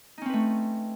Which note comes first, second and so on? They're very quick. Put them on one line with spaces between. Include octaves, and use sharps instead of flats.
D#4 C#4 C4 B4 A3